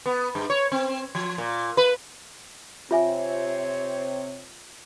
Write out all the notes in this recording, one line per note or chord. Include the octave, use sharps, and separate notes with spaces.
B3
G2
C#5
C4
F3
A#2
B4
C3 C4 F4 C#5 E5 G#5